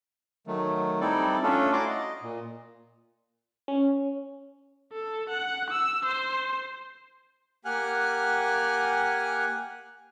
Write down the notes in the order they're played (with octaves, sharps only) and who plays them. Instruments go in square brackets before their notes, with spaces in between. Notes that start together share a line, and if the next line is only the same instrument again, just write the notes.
[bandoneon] D#3 F#3 A3
G3 C4 D#4 E4 A4 D5
A3 C#4 D4 F4 A4
E4 F#4 D5 A#5 C6 D6
D#5
A#2
[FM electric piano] C#4
[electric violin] A4
F#5
E6
C5
[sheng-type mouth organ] A#3 G4 F#5 G#5 F6 F#6